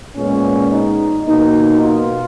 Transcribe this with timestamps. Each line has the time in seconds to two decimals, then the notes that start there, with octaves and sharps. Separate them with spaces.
0.16 A#2 G#3 B3 C#4
0.72 D#4
1.27 B2 A#3 D#4
1.82 F4